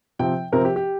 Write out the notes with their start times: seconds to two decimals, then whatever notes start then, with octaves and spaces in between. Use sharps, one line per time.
0.19 C3 F3 C4 G5
0.52 C3 F3 C4 A#4
0.65 G4
0.76 G4